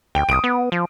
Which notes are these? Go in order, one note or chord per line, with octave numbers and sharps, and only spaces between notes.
D2 G5
C2 D#6 D7
B3
F3